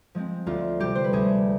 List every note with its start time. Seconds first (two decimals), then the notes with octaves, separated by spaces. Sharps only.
0.15 F3 G#3 C4
0.46 D2 F4
0.80 C3 G3 G4
0.95 C5
1.04 B4
1.13 D2 G#4